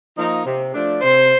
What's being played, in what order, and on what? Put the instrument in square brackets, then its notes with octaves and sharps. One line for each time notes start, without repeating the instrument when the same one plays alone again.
[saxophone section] F3 A#3 D#4
C3
F3 A3 D4
[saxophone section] C3 [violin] C5